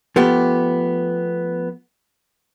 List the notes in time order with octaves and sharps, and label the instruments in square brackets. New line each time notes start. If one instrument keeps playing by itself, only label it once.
[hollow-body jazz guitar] F3 A3 B3 G4